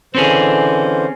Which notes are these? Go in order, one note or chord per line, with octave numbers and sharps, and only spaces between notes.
D3 E3 C4 C#4 G#4 C5